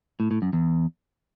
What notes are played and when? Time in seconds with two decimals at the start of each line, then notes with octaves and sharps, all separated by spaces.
0.20 A2
0.31 A2
0.42 F#2
0.53 E2